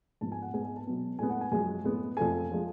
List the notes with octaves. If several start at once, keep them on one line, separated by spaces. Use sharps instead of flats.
G#2 F3 B3 A5
G#5
F#5
G#2 G#3 B3 G#5
G#5
A5
B2 F#3 B3
A2 G#3 B3 G#5
F#5
G#5
F#2 F3 G#3 G#5
A2 G#3 B3
F2 F3 A3 G#5
F3 G#3